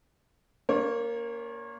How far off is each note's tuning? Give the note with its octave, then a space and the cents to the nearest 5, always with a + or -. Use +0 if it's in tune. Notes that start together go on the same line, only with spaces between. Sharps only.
A#3 +0 C#4 +40 C#5 -40